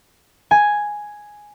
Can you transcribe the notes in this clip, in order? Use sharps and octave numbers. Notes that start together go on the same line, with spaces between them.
G#5